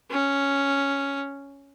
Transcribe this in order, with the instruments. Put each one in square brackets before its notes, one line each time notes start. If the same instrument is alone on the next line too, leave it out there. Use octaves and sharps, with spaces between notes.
[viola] C#4